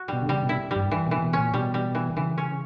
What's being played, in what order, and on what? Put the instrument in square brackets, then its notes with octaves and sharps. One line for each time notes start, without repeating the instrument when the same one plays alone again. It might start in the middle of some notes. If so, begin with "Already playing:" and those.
Already playing: [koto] F#4
[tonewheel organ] B2 [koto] G3
[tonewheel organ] D3
[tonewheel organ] C#3 [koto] G3
[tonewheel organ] B2
[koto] E4
G3
[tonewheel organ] G2
[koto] E3
[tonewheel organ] B2 [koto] E3
[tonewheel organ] B2
[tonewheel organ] A#2 [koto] C#4
[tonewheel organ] B2 [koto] G3
[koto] G3
E3
[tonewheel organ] C#3 [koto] E3
[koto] C#4